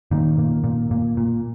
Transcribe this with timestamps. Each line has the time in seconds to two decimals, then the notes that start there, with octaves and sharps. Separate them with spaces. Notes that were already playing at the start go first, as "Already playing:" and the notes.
0.11 A#2 D#3
0.38 A#2
0.64 A#2
0.91 A#2
1.17 A#2